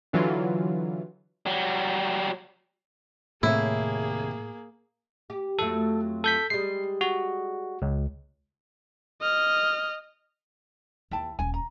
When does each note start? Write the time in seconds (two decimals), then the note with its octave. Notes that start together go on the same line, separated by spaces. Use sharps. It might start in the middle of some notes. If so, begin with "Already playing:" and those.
0.13 D3 E3 F#3 F4
1.46 F#3 G3
3.43 D#2 A2 C3 A#3 E4 G#4 C#5
5.30 G4
5.59 F2 F#3 A3 A4
6.24 A4 G6 B6
6.50 G3 G#3 C7
7.01 F#4
7.82 C#2
9.21 D#5 F6
11.11 D#2 E4 G5 A5
11.39 D#1 C#4 G#5
11.54 A#5